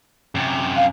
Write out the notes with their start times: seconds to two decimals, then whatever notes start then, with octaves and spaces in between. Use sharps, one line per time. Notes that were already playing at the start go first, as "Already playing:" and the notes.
0.35 F#2 C3
0.77 F5